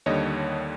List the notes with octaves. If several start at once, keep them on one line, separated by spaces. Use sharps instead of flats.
D#2 D3 G3 C#5 D#5